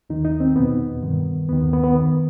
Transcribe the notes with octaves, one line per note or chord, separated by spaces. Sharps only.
D#2 D#3 D#4
D#4
C4
E2 B2 B3
G2 D#3
D#2 D#3 B3
B3
B3
F#2 D#3